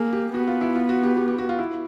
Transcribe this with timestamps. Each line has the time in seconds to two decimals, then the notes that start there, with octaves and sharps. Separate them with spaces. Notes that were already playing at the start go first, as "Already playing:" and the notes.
Already playing: A#3 G#4
0.13 G4
0.33 B3 F#4
0.47 F4
0.61 E4
0.76 F4
0.89 F#4
1.03 G4
1.17 G4
1.28 G4
1.38 F#4
1.49 F4
1.59 E4